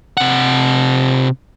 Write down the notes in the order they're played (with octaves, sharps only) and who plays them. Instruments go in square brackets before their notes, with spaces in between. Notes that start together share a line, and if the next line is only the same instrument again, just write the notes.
[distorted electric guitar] C3 F#5